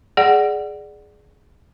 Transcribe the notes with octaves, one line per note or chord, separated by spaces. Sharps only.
G#4 D5 F#5